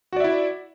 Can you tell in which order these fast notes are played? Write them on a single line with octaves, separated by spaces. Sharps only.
F#4 D5 E5 E4